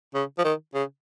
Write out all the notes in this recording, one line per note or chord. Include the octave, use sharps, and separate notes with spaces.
C#3
F3
D#3
C#3